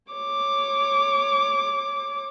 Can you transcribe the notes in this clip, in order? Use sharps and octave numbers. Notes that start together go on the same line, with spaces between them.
C#5 D6